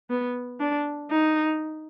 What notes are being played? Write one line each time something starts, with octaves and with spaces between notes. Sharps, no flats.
B3
D4
D#4